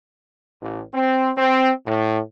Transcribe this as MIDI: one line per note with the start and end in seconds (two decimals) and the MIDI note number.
0.60 0.81 33
0.93 1.30 60
1.36 1.70 60
1.86 2.18 45